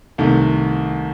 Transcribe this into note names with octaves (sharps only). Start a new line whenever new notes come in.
C2 C3 D#3 A3